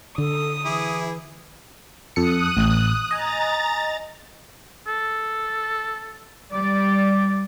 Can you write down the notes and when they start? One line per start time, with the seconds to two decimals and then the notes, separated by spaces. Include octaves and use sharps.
0.18 D3 A4 D#6
0.65 E3 E4 G#4 D6
2.16 F2 A4 D#6 F#6 C#7
2.57 A1
3.11 D#5 G#5 A#5 A6
4.87 A4
6.53 G3 D5 D6